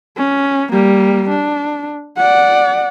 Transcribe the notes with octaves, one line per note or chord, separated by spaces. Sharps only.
C#4
G3 A#3
D4
D5 F#5